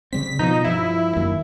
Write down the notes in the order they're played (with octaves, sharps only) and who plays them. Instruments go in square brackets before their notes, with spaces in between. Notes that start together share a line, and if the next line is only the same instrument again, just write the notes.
[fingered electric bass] C#3 G3 C4 [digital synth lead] B6
[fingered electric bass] B2 F3 [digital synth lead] D#4
[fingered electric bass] G2 F3 [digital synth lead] E4
[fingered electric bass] F#2 D#3 A#3